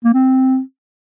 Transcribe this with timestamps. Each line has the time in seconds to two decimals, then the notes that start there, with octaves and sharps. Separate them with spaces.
0.04 A#3
0.14 C4